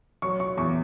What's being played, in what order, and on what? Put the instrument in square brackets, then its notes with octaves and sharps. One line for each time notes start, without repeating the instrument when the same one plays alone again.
[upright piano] F#3 [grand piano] C#6
[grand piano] C#6
[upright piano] E2 [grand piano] C#6